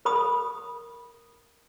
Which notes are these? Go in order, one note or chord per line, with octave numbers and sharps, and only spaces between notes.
A#4 B5 D#6